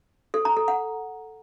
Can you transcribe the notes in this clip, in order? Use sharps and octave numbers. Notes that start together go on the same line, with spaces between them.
A4
A#5
A4
F#5